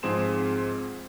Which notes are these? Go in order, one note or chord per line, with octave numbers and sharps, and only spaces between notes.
G#2 F3 C4 G#4 C6 E7